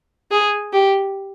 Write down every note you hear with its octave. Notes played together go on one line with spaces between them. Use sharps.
G#4
G4